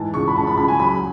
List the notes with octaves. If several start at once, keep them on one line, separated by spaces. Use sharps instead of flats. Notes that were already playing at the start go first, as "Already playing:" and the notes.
Already playing: G#2 E3 A5
C#2 C#6
B5
C#2 A5
B5
C#2 B5
G#5
F#3 B5